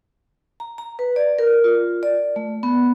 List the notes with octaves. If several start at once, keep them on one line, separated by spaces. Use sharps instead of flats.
A#5
A#5
B4
D5
A#4
F4
D5
A3
B3